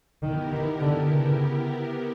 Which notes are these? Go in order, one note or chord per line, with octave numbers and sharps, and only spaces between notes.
D#3 B3 E4 G4 A#4
D#3
D3
C#3